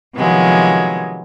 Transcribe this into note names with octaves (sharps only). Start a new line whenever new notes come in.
C3 D#3 F3 F#3 G#3 B3